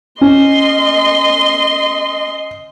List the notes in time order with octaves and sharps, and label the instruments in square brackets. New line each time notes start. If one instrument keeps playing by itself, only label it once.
[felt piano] C#4 [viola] D#5 C6